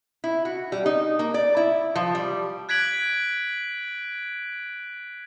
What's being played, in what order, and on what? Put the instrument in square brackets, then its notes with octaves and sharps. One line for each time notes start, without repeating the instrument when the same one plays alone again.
[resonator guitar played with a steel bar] E4
F#4
G3
D#4
A#3
D5
E4
F3
G3
[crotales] F#6 G#6 B6 D7 F#7